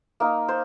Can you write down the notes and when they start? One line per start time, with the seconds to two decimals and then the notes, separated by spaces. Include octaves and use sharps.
0.20 A#3 D#4
0.48 C5